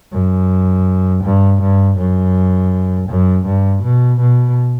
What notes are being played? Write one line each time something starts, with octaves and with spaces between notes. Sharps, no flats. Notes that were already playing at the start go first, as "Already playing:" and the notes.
F#2
G2
G2
F#2
F#2
G2
B2
B2